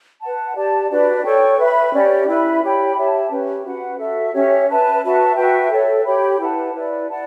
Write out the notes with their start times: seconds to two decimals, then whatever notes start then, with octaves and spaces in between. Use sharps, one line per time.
0.21 B4 F#5 A5
0.55 G4 D5 A5
0.90 D4 F#4 B4 D5
1.24 A4 C#5 G5 C#6
1.58 B4 E5 B5
1.92 C#4 G4 D5
2.28 E4 B4 E5 B5
2.62 G4 C#5 G5 B5
2.96 G4 C#5 E5 A5
3.30 C#4 G4 B4
3.64 F#4 B4 F#5
3.98 F#4 A4 E5
4.34 C#4 G4 C#5 E5
4.68 B4 E5 A5
5.03 F#4 B4 E5 A5
5.36 F#4 B4 E5 G5
5.71 A4 C#5 E5
6.05 G4 C#5 G5 B5
6.40 E4 B4 F#5 A5
6.73 E4 B4 D5
7.09 D5 F#5 A5